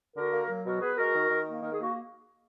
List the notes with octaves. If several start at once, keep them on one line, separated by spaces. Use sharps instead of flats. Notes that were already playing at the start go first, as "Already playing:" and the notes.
D3 F#4 A#4
A#3
F#3
B2 F#4 A#4
B3 G#4 B4
G#3 F#4 A#4
D#3
D#3
A#3
D#3 A#4
G#4
A#3 F#4